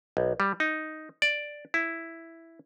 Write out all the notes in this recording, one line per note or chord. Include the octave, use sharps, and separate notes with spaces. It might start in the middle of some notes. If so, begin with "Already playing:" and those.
B1
G3
D#4
D5
E4